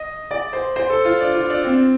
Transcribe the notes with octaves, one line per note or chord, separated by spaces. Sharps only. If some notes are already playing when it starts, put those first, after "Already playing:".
Already playing: D#5
D5
C5
C5
A4
F4
D4
F4
D4
C4